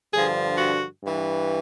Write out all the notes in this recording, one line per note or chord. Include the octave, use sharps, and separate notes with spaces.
G2 D3 F3 G#4
F#4
G2 E3